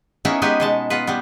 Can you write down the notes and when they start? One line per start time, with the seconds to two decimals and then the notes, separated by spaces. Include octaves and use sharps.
0.25 A#3 B3 C#4 D#4 E4
0.42 G#3 B3 D#4 G4 B4 G#5
0.60 B2 G#3 A5
0.90 B3 F4 B4
1.07 G3 B3